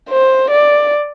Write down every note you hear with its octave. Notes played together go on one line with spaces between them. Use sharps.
C5
D5